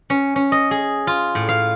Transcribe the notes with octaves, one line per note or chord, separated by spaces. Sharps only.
C#4
C#4
D#5
G#4
F4
A2
F5